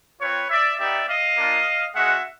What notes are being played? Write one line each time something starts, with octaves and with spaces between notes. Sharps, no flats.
C4 F4 B4 C#5
D5 E5
B3 D#4 G4 D5 E5
D#5 F5
A#3 D4 F4
G#3 C#4 F#4 E5 F#5